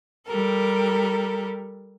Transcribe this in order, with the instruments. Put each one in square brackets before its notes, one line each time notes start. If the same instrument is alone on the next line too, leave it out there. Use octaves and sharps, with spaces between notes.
[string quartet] G3 A4 A#4